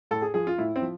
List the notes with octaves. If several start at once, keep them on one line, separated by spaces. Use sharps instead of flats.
A2 A4
G#4
F3 G#4
F4
A2 E4
C4
F3